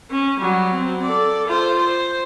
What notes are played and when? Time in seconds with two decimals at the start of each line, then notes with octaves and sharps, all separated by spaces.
0.11 C#4
0.40 F#3 G3
0.73 C4
1.03 A4 D5
1.47 F4 C5
1.79 C5